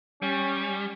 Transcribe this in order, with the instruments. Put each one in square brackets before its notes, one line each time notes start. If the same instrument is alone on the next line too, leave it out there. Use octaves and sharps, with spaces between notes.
[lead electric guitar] G3 [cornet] C#4